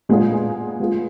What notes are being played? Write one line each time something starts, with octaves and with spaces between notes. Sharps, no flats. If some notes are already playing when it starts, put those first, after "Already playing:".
A#2 G#3 B3 F4 G#4
G#3 B3 F4 G#4